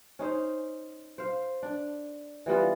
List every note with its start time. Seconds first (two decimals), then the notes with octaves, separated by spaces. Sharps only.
0.19 C#4 D#4 C5
1.18 C5 F5
1.63 D4
2.46 E3 G3 B3 F4